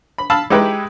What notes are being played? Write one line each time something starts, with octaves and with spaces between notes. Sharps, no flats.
B5
F5 A5 B5 E6
G#3 D#4 E4 G4 B4